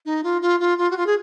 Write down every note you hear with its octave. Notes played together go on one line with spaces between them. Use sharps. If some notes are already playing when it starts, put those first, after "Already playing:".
D#4
F4
F4
F4
F4
F#4
F4
G#4